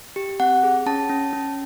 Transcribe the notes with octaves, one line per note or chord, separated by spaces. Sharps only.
G4
C4 F#5
G#4
C#4 A5
C#4
C#4